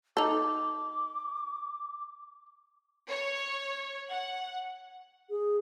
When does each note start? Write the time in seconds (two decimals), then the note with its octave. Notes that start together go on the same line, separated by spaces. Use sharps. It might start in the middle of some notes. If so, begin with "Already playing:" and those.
0.17 D#4 A4 D6
3.09 C#5
4.08 F#5
5.30 G#4